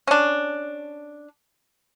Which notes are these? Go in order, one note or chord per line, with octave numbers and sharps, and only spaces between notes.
C#4 D4